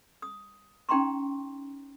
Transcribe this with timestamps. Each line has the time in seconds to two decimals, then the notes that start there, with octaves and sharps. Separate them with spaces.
0.22 D#6
0.89 C#4 D#4 G5 A#5 C6 C#6